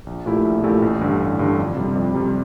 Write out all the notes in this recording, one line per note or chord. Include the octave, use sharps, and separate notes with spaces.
A#1
A#2 A3 E4 G4
A#1
A#2 A3 E4 G4
A1
G2 D3
A1
G2 D3
F2
C3 G3
F2
C3 G3